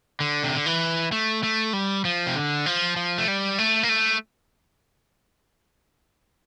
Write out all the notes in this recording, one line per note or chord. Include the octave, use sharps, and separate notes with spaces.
D3
C3
D3
E3
A3
A3
G3
F3
C3
D3
F3
F3
A3
G3
A3
A#3
A3